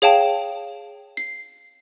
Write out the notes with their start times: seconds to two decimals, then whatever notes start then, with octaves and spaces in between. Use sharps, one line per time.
0.02 G#4 C#5 F5 G5 A5
1.17 C7